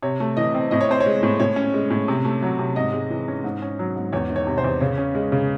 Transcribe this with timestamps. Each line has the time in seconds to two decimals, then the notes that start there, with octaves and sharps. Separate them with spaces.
0.03 C3 C#5
0.20 A3
0.37 E3 D#5
0.54 C4
0.71 A2 D#5
0.81 C#5
0.89 C4 C5
1.00 C#5
1.06 G#3
1.23 A2
1.40 A2 C#5
1.56 C#4
1.74 G#3
1.90 A2
2.08 C3
2.25 A3
2.42 F#3
2.59 C3
2.76 G#2 D#5
2.93 G#3
3.10 E3
3.28 C#4
3.44 G#2
3.62 C#4
3.79 F#3
3.95 G#2
4.13 E2 C#5
4.30 D#3
4.36 C#5
4.47 C3
4.58 C5
4.64 E2
4.80 C#3 C#5
4.98 C#4
5.15 G#3
5.32 C#3